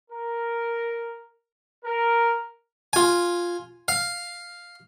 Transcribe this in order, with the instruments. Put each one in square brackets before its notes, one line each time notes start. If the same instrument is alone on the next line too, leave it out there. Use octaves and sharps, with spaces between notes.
[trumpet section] A#4
A#4
[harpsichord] F4 G#5
F5